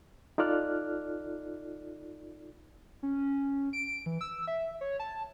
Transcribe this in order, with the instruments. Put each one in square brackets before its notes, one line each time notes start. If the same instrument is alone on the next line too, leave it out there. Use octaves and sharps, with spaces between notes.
[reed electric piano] D#4 F4 A4 D5 F6 F#6
[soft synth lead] C#4
D7
E3
E6
E5
C#5
A5